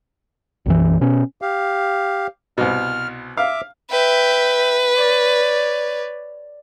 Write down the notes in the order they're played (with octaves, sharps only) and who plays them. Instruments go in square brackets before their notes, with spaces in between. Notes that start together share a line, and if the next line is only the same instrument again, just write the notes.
[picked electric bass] B1 F#2 E3
B2 C#4
[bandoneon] G4 F5
[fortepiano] C2 B2 [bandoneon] F6
[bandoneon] E5 D6 [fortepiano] F5
[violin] B4 [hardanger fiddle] E5 G5
[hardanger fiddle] C#5 D5